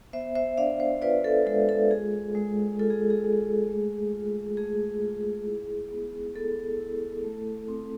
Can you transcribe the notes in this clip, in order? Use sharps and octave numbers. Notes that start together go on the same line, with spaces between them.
B3 C5 E5
C5 E5
D4 D5 F5
C5 E5
F4 B4 D5
A4
G#3 A4
A4
G#3 G#4
G#3
F4 A4
G#4
G#4
G#3
A3
F4
A3 G#4
F4
E4
B3
B3 A4
E4
A3
C4